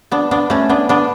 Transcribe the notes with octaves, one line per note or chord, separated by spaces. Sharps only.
B3 D4
B3 D4
A3 C#4
B3 D4
B3 D4